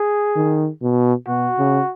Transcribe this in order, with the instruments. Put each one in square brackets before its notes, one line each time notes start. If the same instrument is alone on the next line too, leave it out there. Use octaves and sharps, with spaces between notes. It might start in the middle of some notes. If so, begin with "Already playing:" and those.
Already playing: [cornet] G#4
[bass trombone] D#3
B2
[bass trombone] B2 [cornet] F#4
[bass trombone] C#3